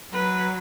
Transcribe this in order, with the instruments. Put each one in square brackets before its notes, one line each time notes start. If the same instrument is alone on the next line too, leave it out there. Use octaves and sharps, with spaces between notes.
[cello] F#3 [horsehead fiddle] B4